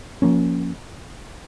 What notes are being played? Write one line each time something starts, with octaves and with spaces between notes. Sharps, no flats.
F3 A#3 C#4